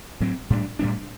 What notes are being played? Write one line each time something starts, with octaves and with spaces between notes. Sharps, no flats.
A2 F#3 C4
A2 G3 B3 D4
A2 G3 B3 D4